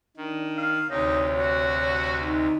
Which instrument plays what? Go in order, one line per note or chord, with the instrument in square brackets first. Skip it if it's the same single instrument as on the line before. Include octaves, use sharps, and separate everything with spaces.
[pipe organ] D#3 [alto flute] D4
[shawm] F5
[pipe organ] D2 C3 [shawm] D#4 [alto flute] C#5
[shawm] F#4
[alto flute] D#4